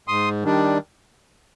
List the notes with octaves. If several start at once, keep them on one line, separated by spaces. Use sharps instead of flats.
G#2 C6 D#6
D#3 G3 D4